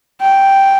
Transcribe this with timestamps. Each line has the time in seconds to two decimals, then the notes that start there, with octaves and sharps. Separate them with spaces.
0.21 G5